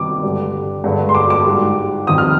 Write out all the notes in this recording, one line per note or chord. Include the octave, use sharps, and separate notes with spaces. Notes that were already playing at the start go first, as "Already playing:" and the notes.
Already playing: C3 D#3 G3 D6
G2 D3 G3
G2 D3 G#3
C6
D6
D6
G#2 G3
F2 C3 D#3 G3 D#6
F6